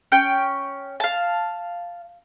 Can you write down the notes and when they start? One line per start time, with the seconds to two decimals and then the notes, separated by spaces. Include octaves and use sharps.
0.12 C#4 G5 G6
1.00 F5 A5